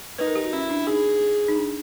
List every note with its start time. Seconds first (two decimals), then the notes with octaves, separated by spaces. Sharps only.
0.18 D#4 B4
0.27 A#4
0.35 G4
0.44 F#4
0.53 C#4 E4
0.70 D4
0.87 D#4 G#4
1.48 D#4
1.56 D4